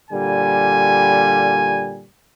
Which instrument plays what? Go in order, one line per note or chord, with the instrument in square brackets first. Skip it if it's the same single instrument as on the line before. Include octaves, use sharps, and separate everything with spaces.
[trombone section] A#2 D3 G3 [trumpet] G#5